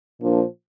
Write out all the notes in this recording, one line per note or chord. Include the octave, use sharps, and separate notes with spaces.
A#2 F3 A#3 D4